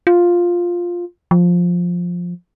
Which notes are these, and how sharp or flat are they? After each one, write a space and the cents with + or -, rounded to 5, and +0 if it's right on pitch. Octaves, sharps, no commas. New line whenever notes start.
F4 +5
F3 +10